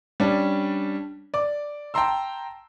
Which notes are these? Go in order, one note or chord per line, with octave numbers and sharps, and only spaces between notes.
G3 C#4 D4
D5 D6
G5 A5 A#5 C6 E6